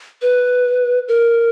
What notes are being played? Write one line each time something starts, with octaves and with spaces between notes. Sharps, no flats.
B4
A#4